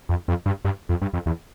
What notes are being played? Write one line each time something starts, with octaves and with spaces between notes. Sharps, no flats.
F2
F2
G2
G2
F2
G2
F2
E2